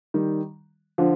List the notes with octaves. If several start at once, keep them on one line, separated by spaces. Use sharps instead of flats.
D#3 G3
D3 F3